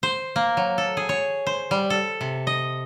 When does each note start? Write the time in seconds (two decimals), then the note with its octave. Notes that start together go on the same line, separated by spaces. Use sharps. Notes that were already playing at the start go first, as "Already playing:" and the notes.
0.03 C5
0.36 A#3
0.57 F#3
0.78 A4
0.97 G#4
1.09 C#5
1.47 C5
1.71 G3
1.90 A4
2.21 C3
2.47 D#5